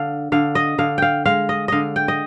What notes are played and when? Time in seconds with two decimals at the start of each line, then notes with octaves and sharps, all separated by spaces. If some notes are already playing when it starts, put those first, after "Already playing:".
Already playing: D3 F5
0.32 D3 F5
0.55 D#5
0.78 D3 F5
0.98 F5 G5
1.26 G#3 F5
1.49 D#5
1.68 D3 D#5 F5
1.96 G5
2.08 D#5